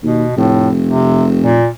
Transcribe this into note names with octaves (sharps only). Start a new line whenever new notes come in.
D#2 B2
F1 A2
C3
A#2